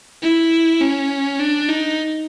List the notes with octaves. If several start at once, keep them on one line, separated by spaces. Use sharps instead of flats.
E4
C#4
D4
D#4